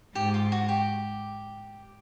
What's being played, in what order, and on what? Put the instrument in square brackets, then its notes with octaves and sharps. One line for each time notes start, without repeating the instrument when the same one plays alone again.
[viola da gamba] G#2 [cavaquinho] G4
[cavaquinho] F4
F#4
G4